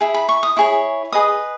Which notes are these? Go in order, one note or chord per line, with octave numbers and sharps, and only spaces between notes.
E4 G#4
B5
C#6
D#6
E4 G#4 C#5 C#6
G#4 B4 D#5 D#6